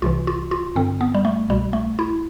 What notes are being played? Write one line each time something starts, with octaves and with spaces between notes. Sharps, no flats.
C2 C3 E3 F4
F4
F4
G2 D3 C4
B3
G3
A3
C2 B2 G3
A3
E4